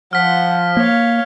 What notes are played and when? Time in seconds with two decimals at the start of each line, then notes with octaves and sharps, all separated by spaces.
0.13 F3 F#5 F6 B6
0.77 A#3 C#5 F5